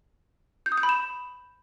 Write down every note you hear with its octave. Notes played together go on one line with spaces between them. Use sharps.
G6
D#6
G6
B5
E7